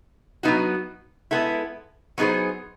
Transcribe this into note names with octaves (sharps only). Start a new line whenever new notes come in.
F#3 B3 D#4 F#4
G#3 B3 E4 A4
F#3 B3 D#4 G#4 C5